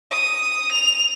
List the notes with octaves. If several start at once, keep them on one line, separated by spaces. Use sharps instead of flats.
D#6
F7